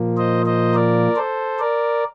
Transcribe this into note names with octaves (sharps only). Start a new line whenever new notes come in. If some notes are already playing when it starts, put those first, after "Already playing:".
Already playing: A#2 F3 A#3
C5 D#5
C5 D#5
A#4 D5
A4 C5
A#4 D5